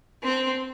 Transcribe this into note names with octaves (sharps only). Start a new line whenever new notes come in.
C4